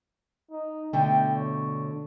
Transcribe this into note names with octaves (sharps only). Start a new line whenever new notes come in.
D#4
B2 D3 A3 G5
C#5